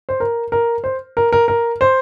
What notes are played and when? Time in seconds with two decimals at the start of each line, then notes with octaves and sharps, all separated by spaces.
0.09 C5
0.20 A#4
0.52 A#4
0.84 C5
1.17 A#4
1.32 A#4
1.48 A#4
1.81 C5